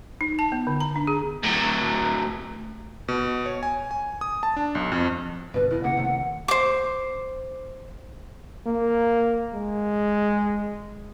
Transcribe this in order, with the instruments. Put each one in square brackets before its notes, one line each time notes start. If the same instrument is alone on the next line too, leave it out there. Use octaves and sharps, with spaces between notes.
[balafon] D#4
A5
B3
D3
A#5
D4
G#4
[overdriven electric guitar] A2 F#3
[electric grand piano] B2
C#5
G#5
G#5
D#6
A5
D4
B1
F2
[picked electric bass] G2 B2 D3 [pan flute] B4
[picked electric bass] E2 B2 [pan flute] E4
[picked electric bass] G1 C#3 A#3 [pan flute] F#5
[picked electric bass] C3 D#3 A3
[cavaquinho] C5 D6
[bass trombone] A#3
G#3